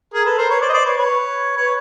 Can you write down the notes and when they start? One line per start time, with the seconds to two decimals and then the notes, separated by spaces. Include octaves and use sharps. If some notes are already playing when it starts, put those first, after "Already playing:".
0.14 G#4 A#4
0.26 A4 B4
0.38 A#4 C5
0.50 B4 C#5
0.61 C5 D5
0.69 D#5
0.73 C5 D5
0.86 B4 C#5
0.97 B4 C#5
1.57 B4 C#5